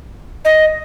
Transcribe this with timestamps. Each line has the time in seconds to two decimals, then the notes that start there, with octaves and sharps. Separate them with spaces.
0.45 D#5